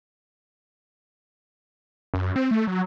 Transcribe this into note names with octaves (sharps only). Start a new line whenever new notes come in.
F#2
C4
A3
F#3